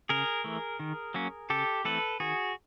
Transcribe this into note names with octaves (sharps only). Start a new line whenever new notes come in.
C#3 G#4 A#4
E3 A3
D#3
F#3 A#3 C#4
C#3 G4 A4
E3 A3 C4 A4 B4
D#3 F#4 G#4